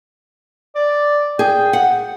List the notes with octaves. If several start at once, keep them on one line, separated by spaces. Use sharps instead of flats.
D5
G#4 G5
F#5